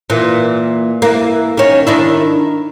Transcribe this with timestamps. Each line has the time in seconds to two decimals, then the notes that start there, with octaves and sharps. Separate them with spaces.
0.10 A#2 E3
1.02 E3 A#3
1.57 D#3 C#4
1.87 D#3 D4 E4